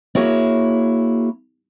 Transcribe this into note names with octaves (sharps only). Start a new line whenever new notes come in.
A#3 E4 F#4 G#4 C#5